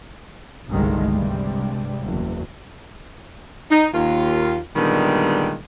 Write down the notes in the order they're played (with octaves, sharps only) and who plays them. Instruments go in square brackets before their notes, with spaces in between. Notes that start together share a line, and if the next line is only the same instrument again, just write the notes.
[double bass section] G1 C2 G2 D#3 G#3 A3
G2 C3 G3 G#3
F#1 E2
[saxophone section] D#4
D#2 F4
A#2 D3 D#3 G3 G#3 B3